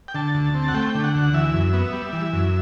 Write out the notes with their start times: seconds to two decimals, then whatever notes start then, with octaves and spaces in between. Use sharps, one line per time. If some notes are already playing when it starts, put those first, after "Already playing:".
0.08 G5
0.15 D3 A5
0.35 D2
0.54 C4
0.68 F#5
0.74 A3 G5
0.95 D3
1.04 F#5
1.15 D2
1.34 E3 E5
1.54 F#2
1.73 B3
1.93 G3
2.13 E3
2.33 F#2